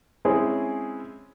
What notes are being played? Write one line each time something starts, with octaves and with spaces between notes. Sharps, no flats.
G#3 C4 C#4 E4 G#4